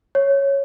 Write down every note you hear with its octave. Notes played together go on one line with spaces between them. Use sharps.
C#5